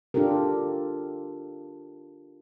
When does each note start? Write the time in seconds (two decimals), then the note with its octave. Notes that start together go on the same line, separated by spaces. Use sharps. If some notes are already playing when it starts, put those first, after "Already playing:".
0.14 D4 F4 G4 A4 A#4